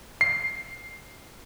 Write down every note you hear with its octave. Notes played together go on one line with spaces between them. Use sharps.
C7